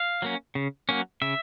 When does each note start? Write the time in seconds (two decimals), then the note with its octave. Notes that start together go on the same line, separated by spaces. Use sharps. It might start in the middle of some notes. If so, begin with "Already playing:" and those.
Already playing: F5
0.22 F#3 A#3 C#4
0.55 C#3
0.89 F#3 A#3 C#4
1.22 C#3 E5